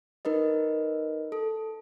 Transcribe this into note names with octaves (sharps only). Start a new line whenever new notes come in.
D#4 A#4 B4 D#5
A4